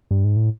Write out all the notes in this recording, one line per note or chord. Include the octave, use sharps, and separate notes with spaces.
G2
G#2
A2